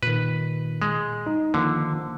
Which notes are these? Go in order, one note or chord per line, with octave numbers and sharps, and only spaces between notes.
A#2 D#3 B4
G#3
D#4
D3 D#3 F3 A#3